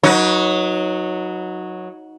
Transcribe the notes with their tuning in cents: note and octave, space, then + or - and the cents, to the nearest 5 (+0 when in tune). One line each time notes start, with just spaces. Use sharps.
F#3 -10 D#4 +15 B4 -25